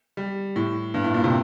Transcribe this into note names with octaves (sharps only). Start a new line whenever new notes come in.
G3
A2
G2
A2
A#2
C3